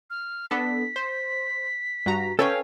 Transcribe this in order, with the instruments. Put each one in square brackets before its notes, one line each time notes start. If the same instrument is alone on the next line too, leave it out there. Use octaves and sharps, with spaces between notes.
[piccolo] F6
[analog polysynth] B3 D4 A4 [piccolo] B6
[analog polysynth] C5
G2 F#4 A#5
[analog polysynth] C#4 G5 [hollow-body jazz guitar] A4 B4 C#5 [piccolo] F5